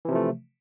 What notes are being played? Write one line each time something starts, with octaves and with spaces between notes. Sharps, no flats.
C3 E3 F3 A3